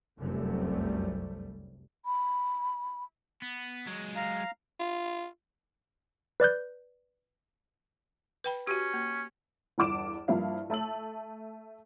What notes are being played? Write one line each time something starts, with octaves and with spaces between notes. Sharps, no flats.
F1 C2 F#2 C3 G3 A3
B5
B3
F#3 G#3
F5 A#5
F4
B4 D5 F#6 G6
B4 G5 B5
C#4 F#4 G4
A#3
G1 E2 G2 D6 D7 E7
G2 F3 A#3 E4 F5
A3 A5 E6 F#7